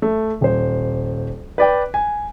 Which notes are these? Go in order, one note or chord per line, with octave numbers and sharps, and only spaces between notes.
A3
D#1 C5
B4 D5 G5
G#5